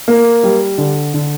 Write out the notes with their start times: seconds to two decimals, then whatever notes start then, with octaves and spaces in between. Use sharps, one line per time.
0.08 A#3
0.43 G3
0.78 D3
1.14 D3